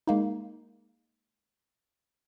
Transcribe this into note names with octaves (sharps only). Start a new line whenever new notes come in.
G#3 A#3 D#4